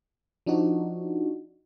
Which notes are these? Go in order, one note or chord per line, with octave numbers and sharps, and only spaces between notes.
F3 D4 D#4 F#4